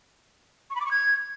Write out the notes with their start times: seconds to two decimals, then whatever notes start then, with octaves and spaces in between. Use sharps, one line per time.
0.70 C#6
0.75 B5
0.81 D6
0.86 C#6
0.91 G#6